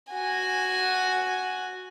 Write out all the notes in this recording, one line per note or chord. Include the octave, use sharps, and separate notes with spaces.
F#4 G#5